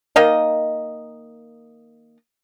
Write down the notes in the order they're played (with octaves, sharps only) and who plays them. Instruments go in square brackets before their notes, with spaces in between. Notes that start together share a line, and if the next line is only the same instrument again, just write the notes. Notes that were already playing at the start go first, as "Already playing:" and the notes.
[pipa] D#3 A#3 D#5